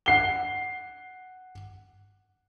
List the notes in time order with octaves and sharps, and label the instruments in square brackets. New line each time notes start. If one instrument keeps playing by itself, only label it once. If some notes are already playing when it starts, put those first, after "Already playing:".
[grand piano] F#5 C7 G7